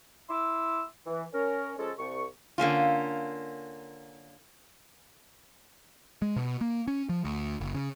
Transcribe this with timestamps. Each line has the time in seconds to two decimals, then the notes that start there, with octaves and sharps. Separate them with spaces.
0.30 E4 C6 D6 E6
1.06 E3
1.34 C#4 A#4
1.78 F3 G#3 C#4 A4
1.98 C2 C#6
2.58 D3 A#3 C#4 F4
6.22 G#3
6.36 B2
6.61 A#3
6.88 C#4
7.09 F3
7.24 D2
7.60 F#1
7.74 C#3